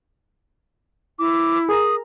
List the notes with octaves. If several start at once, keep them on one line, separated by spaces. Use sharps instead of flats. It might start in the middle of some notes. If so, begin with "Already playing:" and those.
E4 D6
G#4 A#4 A#5 D#6